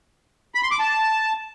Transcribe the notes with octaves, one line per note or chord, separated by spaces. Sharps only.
B5
C6
D6
A5